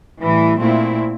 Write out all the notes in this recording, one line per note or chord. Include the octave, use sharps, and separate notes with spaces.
A2 E3 G3
A#2 A3 C4 E4